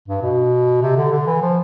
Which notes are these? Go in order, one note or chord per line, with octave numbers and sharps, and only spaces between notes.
G2
B2
C3
D3
D3
E3
F3